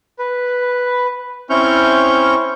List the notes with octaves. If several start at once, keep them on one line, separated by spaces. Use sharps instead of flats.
B4
C4 C#4 E4 C#6 F6 G6